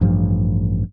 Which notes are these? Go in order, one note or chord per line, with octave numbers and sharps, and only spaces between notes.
A1 G2 F3